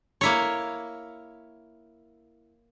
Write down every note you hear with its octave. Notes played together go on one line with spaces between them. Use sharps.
A#3 E4 C#5